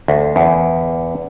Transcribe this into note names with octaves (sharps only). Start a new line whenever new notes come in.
D2
E2